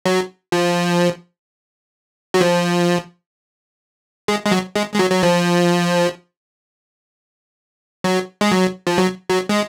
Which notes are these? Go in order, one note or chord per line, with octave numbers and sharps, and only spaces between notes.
F#3
F3
F#3
F3
G#3
G#3
F#3
G#3
G#3
F#3
F#3
F3
F#3
G#3
F#3
F3
F#3
F#3
G#3